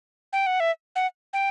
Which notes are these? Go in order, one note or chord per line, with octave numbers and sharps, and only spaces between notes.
G5
F#5
E5
F#5
G5